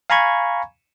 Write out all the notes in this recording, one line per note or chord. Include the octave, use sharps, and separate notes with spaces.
F5 G#5 A#5 B5 C#6 G#6